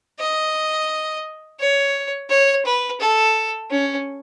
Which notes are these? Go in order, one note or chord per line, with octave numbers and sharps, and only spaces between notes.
D#5
C#5
C#5
B4
A4
C#4